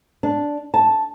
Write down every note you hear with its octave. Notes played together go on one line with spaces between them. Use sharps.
D4
A5